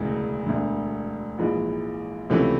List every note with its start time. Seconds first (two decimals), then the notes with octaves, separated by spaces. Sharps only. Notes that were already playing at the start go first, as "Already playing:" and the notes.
Already playing: E1 D2 C#3 E3 G#3
0.46 E1 D2 D3
1.38 A#1 G#2 E3 G#3
2.30 C#2 C3 E3 A3 C#4